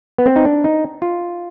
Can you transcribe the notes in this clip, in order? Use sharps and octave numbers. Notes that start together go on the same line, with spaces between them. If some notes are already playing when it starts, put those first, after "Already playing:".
B3
C4
D#4
D4
D#4
F4